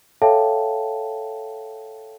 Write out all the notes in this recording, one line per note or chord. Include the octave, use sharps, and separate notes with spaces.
A4 C#5 E5 F5 G5 A5